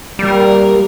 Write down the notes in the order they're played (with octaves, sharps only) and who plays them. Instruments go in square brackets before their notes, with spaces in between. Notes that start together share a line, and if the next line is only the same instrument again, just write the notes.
[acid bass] G3 [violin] A#3 A#4